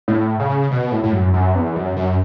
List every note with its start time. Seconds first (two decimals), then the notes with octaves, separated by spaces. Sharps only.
0.08 A2
0.39 C#3
0.71 B2
0.92 A2
1.03 A2
1.12 F#2
1.34 F#2
1.55 E2
1.76 F#2
1.96 F#2